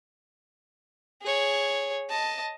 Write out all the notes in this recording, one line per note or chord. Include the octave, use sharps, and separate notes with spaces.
G#4 C#5
D#5 A5